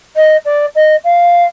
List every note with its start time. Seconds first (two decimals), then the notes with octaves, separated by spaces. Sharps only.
0.16 D#5
0.45 D5
0.75 D#5
1.04 F5